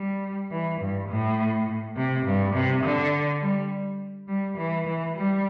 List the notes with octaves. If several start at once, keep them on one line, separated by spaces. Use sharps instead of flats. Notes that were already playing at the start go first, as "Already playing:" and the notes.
Already playing: G3
E3
G2
A2
C3
G2
C3
D3
G3
G3
E3
E3
G3